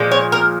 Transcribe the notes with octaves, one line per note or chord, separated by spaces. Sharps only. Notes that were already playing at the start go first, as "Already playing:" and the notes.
Already playing: A#2 F3 G#3
C#5
A#4